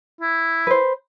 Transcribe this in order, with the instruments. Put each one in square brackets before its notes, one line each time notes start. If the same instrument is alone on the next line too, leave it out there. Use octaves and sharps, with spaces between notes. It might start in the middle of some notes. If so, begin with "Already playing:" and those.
[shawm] E4
[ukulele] B4 C5